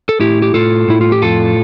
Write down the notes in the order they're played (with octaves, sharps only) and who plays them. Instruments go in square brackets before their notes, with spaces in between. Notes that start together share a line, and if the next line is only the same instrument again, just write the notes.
[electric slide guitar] A4
A2 E4 G4
G4
A2 F4 A4
A2 E4
F4
G4
F2 F4 A4